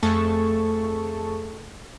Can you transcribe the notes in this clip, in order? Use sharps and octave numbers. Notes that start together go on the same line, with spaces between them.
F2 A3 G#4 A4 A5 C#6